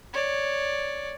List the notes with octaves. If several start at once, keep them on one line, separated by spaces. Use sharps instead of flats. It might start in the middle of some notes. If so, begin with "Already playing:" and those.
C#5 D5